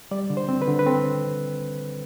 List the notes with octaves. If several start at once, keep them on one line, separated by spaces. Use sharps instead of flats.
G3 D5
D3
C5
C4
B4
D3
B4
C4 A4